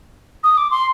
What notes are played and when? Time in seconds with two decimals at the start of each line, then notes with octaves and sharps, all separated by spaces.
0.44 D#6
0.57 D6
0.71 C6